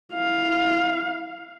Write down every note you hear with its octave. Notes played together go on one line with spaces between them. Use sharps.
E4 F5